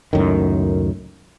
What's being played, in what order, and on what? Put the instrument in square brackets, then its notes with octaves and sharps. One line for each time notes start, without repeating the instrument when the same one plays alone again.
[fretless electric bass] C#2 F#2 A2 D#3